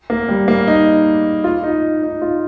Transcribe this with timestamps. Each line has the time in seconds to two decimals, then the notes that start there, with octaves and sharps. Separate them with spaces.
0.10 A#3
0.28 G3
0.48 A#3
0.67 D#4
1.44 F4
1.64 D#4
2.03 D#4
2.22 F4